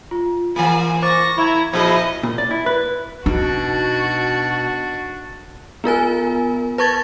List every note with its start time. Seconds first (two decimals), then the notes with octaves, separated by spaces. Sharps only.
0.11 F4
0.56 E3 A#3 G#4 G#5
1.02 C5 C#6 D6 A6 A#6
1.38 E4 A#5 C#6 G#6
1.73 A#2 F3 E4 G#4 C5 D#5
2.23 A#2
2.38 D5
2.51 E4
2.66 B4
3.26 B2 D4 D#4 F#4
5.84 B3 F4 A#4 G#5
6.78 B4 A5 C#6 G#6 A6